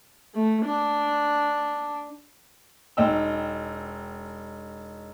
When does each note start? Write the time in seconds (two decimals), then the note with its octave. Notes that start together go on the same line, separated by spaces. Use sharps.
0.35 A3
0.65 D4
2.97 E1 D#4 G5 E6